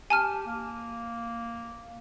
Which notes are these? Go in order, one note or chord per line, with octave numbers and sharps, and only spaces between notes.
G4 G#5 A5 F6
A#3